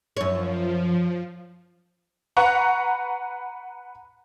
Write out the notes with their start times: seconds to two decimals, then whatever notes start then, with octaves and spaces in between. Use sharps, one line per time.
0.17 F#2 F3 C#5
2.37 B4 F#5 A#5 C#6